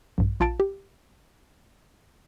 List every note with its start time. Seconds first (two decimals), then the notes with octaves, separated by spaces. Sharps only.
0.18 A#1 G2
0.40 A#1 F4 F5 A5 A6 D7
0.60 G4